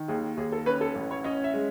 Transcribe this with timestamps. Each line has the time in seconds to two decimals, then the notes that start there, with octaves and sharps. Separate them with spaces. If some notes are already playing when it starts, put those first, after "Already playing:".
Already playing: D#3
0.08 D#2 G#4
0.37 D#2 G#4
0.52 A4
0.66 C#4 B4
0.81 A4
0.95 A1
1.11 C#5
1.24 C#4 D#5
1.44 E5
1.54 G#3